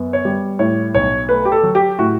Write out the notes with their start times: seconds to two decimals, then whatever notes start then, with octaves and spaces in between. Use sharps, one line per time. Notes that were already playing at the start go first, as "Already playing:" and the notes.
Already playing: F#2 B3
0.13 C#5
0.25 G3
0.59 A2 C#5
0.95 B1 C#5
1.28 A3 B4
1.45 G4
1.52 A4
1.63 F#3
1.75 G4
1.99 A2 F#4